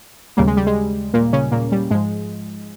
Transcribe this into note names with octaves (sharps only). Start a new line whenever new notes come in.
D#2 A#2 C#3 G3 A#3
G#3
G3
G#3
A#2 A#3
C#3 C#4
A#2 A#3
G3
G#2 F3 G#3